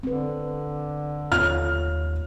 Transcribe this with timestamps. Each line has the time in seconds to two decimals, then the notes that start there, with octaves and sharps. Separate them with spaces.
0.03 D3 C4 B4
1.32 D#2 F4 C#5 F6